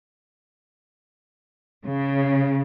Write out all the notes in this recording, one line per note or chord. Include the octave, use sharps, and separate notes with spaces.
C#3